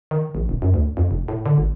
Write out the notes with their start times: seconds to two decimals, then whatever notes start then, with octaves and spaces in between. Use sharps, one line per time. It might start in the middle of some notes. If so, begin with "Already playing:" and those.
0.11 D#3
0.35 A#1
0.49 D#1
0.62 F#2
0.74 D2
0.97 F2
1.11 F1
1.28 A2
1.46 D3
1.58 G#1